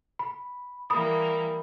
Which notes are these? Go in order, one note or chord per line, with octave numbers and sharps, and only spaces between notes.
B5
E3 G3 A#3 B5 D#6